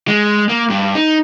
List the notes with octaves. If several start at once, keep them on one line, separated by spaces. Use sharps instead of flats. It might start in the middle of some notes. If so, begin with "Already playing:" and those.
G#3
A#3
G2
D#4